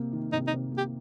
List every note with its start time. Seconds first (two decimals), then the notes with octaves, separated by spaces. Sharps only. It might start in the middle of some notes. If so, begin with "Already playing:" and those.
Already playing: C3 A#3
0.13 D#3
0.32 C3 D#4
0.47 D#4
0.53 C3
0.72 A#3
0.78 G4